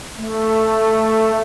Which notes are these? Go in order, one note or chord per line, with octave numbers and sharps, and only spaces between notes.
A3